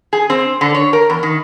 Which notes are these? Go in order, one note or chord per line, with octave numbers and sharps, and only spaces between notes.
G#4
C4
D3
C#5
A#4
E2
D#3